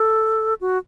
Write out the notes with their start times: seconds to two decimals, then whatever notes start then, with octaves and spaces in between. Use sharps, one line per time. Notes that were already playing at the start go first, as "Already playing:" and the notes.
Already playing: A4
0.61 F#4